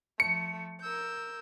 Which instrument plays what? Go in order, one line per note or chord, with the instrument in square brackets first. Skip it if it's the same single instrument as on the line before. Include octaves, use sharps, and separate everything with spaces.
[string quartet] F3 A3 [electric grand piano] C#7
[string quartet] A#4 E6 G6